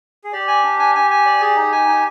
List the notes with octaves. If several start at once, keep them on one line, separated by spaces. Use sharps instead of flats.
G#4
G4 D5
G#5
D4
G#5
G#5
G#5
D5
G#4
D#4
G#5
D#4